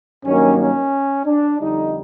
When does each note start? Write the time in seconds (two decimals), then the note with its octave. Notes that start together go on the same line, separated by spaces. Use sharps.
0.24 G2 D#3 F#3 A#3 C#4
0.58 C#4
1.27 D4
1.61 F2 D3 G3 D#4